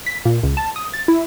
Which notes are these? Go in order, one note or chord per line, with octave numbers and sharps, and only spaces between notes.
B6
A#2
C#2
A5
D#6
A6
E4